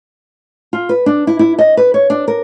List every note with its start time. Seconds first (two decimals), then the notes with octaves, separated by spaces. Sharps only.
0.73 F4
0.89 B4
1.06 D4
1.27 E4
1.39 E4
1.59 D#5
1.77 B4
1.94 C#5
2.10 D4
2.28 A#4